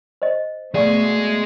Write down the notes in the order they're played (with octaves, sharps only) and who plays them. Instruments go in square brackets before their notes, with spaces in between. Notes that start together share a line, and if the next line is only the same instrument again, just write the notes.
[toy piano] C5 D#5
[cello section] B2 A3 [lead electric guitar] G#3 G#4 [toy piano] D5 F5 C#6